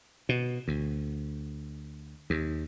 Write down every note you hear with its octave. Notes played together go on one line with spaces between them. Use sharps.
B2
D2
D#2